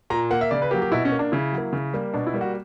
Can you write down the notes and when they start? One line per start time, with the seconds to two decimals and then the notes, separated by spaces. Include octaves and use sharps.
0.10 A#2 A#5
0.31 A#3 F#5
0.41 E5
0.51 C#3 D5
0.62 B4
0.71 F#3 A#3 G4
0.82 G4
0.91 B2 E4
1.05 C#4
1.12 A#3
1.19 D4
1.32 C#3 E4
1.52 F#3
1.58 A#3
1.73 C#3
1.93 G3 A#3
2.14 B2 D4
2.27 E4
2.34 G3 A#3
2.41 F#4